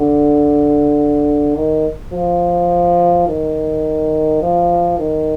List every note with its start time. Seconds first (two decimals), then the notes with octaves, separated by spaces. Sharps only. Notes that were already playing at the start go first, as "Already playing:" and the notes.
Already playing: D3
1.57 D#3
2.13 F3
3.27 D#3
4.42 F3
4.98 D#3